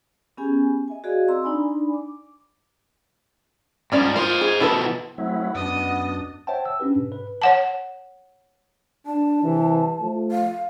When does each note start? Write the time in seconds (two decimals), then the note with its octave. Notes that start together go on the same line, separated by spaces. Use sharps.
0.37 B3 C#4 G4 G#4 G#5
0.88 D#5 E5 G#5
1.04 F#4 G#4 D5 D#5 F5
1.28 C4 A#5 C6 E6
1.43 D4 D#4 D5 G#5 B5
1.94 D6
3.92 G#2 F3 G3 C#4 D5
4.16 F4 A#4 C5 D#5
4.41 G#4
4.60 B2 F3 E4 A4 B4
5.18 F#3 A3 C4 E4 F#5
5.55 F#2 B3 D4 D#5
6.47 C5 C#5 E5 F#5 G5 A5
6.66 E6
6.80 C#4 D4 G4 B4
6.96 G#2 B2
7.12 B4
7.42 C#5 F#5 A5
9.06 D4 A5
9.41 C2 C3 E3
10.01 F3 A3
10.32 F5